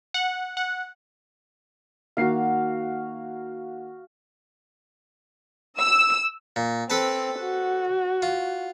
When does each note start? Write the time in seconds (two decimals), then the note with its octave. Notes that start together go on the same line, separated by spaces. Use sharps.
0.14 F#5
0.57 F#5
2.17 D#3 A#3 F#4 F5 C7
5.79 E6
6.56 A#2
6.90 C4 A4 B4 A5
7.41 F#4
8.22 F4